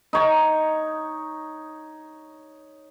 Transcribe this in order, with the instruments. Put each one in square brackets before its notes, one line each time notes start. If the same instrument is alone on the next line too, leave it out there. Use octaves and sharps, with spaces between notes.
[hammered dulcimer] D#4 C#5 A#5